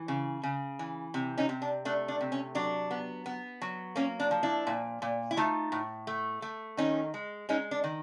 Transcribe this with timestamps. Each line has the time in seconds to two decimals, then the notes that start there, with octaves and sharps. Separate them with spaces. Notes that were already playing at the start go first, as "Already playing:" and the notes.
Already playing: E3
0.08 C#3
0.43 C#3
0.79 E3
1.14 C3
1.38 C#4 D#4
1.49 C3
1.62 D4
1.85 A3 D4
2.08 D4
2.21 C3
2.32 C#4
2.55 F#3 D4
2.91 B3
3.26 B3
3.62 F#3
3.96 A#3 C#4
4.20 D4
4.31 F3
4.43 D4 E4
4.67 A#2
5.02 A#2
5.31 E4
5.37 A3 D#4 F4
5.72 A2
6.07 A3
6.42 A3
6.77 D#3 C#4 D#4
7.14 G#3
7.49 G#3 C#4 D#4
7.71 D4
7.84 D#3